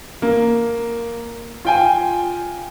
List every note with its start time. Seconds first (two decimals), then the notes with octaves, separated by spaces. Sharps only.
0.22 A#3
1.65 F4 G5 G#5